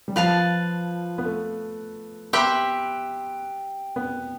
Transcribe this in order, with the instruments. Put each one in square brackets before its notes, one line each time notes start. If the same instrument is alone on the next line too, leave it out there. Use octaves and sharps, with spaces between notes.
[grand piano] G3
[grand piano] F3 [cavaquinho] B4 F5 A5
[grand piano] B3
A3
[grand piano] B3 [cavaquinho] G4 C5 E5 B5
[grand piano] B3